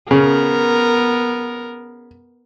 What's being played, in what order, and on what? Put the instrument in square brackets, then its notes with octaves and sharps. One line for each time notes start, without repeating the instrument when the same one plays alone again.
[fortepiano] C#3 [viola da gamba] B3 A#4